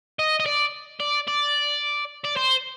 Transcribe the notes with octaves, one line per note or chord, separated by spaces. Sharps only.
D#5
D#5
D5
D5
D5
D5
C5